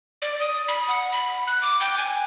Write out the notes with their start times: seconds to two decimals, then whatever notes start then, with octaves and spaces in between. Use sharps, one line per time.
0.22 D5
0.40 D#6
0.68 B5
0.88 F#5
1.12 B5
1.47 F#6
1.62 D6
1.81 G5
1.98 G#5